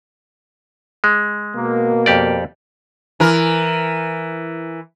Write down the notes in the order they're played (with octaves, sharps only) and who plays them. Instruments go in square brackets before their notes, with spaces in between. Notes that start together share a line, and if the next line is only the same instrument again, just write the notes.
[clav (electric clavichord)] G#3
[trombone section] B2 A#3
[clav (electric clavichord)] F2 G4 D5
[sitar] E3 A#4